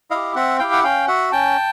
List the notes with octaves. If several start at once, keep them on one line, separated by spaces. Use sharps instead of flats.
E4 G4 D#5 F5
C4 E5 F#5
E4 G4 F5 G5
F#5
C#4 F5 G5
F#4 E5 F#5
C#4 G5 A5